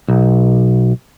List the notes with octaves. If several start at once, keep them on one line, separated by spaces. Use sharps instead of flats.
B1